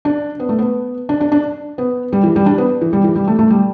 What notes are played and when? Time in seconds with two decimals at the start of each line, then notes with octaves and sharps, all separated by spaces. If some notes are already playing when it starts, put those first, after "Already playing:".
0.05 D4
0.40 B3
0.49 A3
0.59 B3
1.09 D4
1.21 D4
1.32 D4
1.78 B3
2.13 G3
2.24 E3
2.36 G3
2.46 D4
2.58 B3
2.81 E3
2.93 G3
3.04 E3
3.16 G3
3.27 A3
3.39 A3
3.50 G3